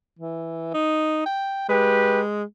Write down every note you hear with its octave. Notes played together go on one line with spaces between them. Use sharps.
E3
D#4
G5
G#3 G4 B4